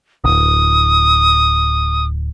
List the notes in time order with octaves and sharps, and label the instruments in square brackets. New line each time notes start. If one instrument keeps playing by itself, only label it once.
[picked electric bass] D1 G#1 [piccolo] D#6